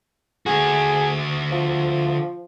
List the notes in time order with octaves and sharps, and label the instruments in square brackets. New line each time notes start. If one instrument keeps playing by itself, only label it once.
[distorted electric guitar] D3 F#4 [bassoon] G#4
[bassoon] F3